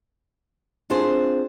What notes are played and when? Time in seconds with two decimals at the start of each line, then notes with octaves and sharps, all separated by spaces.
0.90 C4 D4 F4 G#4 C5